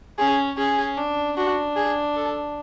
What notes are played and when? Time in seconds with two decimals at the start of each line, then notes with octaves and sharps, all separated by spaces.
0.18 C#4 G#4
0.58 C#4 G#4
0.97 D4
1.37 D4 F#4
1.76 G#4
2.16 A4